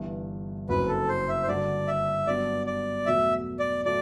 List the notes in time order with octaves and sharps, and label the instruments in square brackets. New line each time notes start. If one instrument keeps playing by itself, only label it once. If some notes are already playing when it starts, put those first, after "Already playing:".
Already playing: [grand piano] G1 G2 E3
[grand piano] F#1 F#2 F#3 C4 [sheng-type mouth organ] B4
[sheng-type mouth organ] A4
C5
E5
C5
[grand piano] G2 D3 G3 D4 F#4 [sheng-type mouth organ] D5
[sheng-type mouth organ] E5
[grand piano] G2 F#3 B3 D4 [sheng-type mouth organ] D5
[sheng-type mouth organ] D5
[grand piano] E2 B2 F#3 A3 [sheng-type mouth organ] E5
[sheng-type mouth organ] D5
[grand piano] A2 F#3 A3 [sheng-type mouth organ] D5